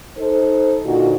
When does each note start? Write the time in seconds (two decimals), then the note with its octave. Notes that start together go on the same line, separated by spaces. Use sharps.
0.18 D#4 A4 C5
0.85 A#2 D3 D#4 F4 F#4